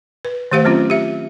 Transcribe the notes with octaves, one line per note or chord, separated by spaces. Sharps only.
B4
D#3 A3 G4 C5 F5
F#3 C4 C#4 F4
G4 E5